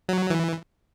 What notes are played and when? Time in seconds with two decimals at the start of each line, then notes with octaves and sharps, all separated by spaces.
0.09 F#3
0.30 E3